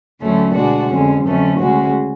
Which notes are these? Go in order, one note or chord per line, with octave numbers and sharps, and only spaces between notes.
D2 D3 F#3 A3 C#4
B2 G#3 D4 F#4
F2 D3 G#3 C#4
F2 D3 F#3 A3 C#4
D2 C#3 G#3 C#4 F#4